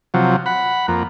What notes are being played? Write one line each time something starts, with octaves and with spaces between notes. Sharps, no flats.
C3 F3 F#3
F#5 B5
F2 A#3